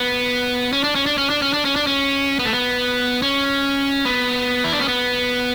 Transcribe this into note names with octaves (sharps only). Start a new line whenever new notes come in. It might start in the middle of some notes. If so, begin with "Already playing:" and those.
Already playing: B3
C#4
D4
C#4
D4
C#4
D4
C#4
D4
C#4
D4
C#4
B3
A3
B3
C#4
B3
E4
D4
C#4
B3